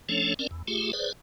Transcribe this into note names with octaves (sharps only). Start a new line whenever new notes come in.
F3 A3 C#4 D4 A4 C#5
C4 C#4 A#4 D5
E2
A3 F4 G4 G#4
G#4 B4 C5 D5